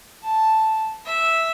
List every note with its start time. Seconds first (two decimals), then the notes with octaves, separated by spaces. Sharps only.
0.24 A5
1.07 E5